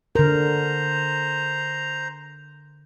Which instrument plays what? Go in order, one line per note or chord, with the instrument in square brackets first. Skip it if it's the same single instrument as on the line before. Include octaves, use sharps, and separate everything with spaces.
[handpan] D3 A#4 [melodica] C5 A#5